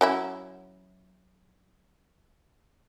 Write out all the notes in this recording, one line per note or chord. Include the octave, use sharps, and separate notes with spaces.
F#3 C#4 E4